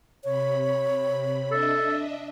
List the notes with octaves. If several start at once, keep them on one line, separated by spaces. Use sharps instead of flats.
C3 C#5 B5
D4 A4 D#5 E5